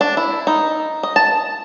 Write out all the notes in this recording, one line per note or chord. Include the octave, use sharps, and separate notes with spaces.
D4
E4
D#4
D#5
A5